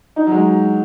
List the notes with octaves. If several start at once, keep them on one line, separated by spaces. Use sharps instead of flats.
D#4
F#3
G#3